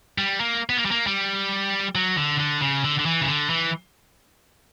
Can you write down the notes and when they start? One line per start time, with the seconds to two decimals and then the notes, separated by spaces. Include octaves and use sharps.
0.18 G3
0.40 A#3
0.70 B3
0.77 A#3
0.85 G3
0.91 A#3
1.07 G3
1.95 F#3
2.18 D3
2.39 D3
2.61 C#3
2.84 D3
2.99 D3
3.06 E3
3.21 C#3
3.29 D3
3.50 E3